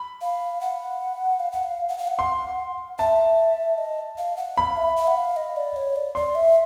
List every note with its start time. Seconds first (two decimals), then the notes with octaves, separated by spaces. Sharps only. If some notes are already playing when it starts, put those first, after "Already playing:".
Already playing: B5
0.21 F5
0.61 F#5
1.40 F5
1.52 F#5
1.63 F5
1.89 F#5
1.98 F5
2.07 F#5
2.19 C6
2.99 E5 A5
3.78 D#5
4.18 F5
4.37 F#5
4.57 F5 B5
4.77 E5
4.97 E5
5.07 F#5
5.17 F5
5.36 D#5
5.56 D5
5.76 C#5
5.96 D5
6.15 D5 C6
6.35 E5